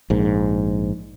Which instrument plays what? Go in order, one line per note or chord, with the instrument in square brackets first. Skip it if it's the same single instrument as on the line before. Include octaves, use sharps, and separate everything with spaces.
[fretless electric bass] A#1 G#2